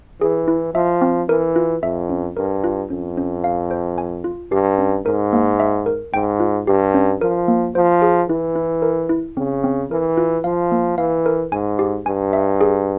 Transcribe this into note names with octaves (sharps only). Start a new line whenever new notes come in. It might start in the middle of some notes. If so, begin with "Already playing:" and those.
E3 G#4
E4
F3 E5
C4
E3 A#4
F4
F2 E5
C#4
G2 A#4
F4
F2 C#4
C#4
F5
C5
G#5
F4
G2 G4
C#4
G#2 A#4
A#3
E5
A#4
G#2 G5
F4
G2 G4
C#4
F3 A#4
A#3
F3 C5
G#4
E3 E4
E4
A#4
E4
C#3 C4
C4
E3 A#4
F4
F3 F5
A#3
E3 F5
A#4
G#2 G#5
G4
G2 G#5
E5
G#4